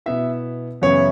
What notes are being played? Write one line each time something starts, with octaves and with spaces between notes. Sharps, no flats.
B2 B3 E4 E5
F#2 C#3 E3 B3 E4 C#5